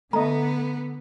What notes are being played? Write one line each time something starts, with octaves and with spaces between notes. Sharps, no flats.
D3 A3 B3 D#5 A#5